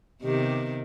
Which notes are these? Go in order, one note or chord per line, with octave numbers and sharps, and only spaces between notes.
C3 D#3 B3 G4